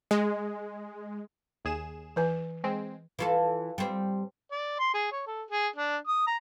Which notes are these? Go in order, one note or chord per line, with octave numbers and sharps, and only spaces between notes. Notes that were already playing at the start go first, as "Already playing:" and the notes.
G#3
D#2 G#4 E7
E3 B4 G#5
G#3 C4
E3 F4 A4
G3 C4
D5
C6
G#4
C#5
A4
G#4
D4
D#6
A#5